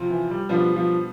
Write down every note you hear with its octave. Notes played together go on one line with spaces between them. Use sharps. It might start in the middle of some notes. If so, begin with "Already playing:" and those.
Already playing: C3 F3 C4 F4
E3
G3
B2 F3 G3 B3 D4
F3